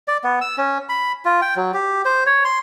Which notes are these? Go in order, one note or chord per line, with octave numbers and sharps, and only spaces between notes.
D5
B3
E6
C#4
B5
F4
G5
F#3
G4
C5
C#5
C6